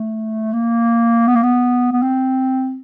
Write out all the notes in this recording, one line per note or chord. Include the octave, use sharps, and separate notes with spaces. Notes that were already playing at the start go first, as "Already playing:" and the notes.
Already playing: A3
A#3
B3
A#3
B3
B3
C4